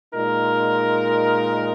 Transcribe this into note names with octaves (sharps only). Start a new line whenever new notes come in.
A#2 G#3 D#4 A#4